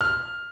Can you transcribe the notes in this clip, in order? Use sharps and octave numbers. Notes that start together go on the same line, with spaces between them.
F6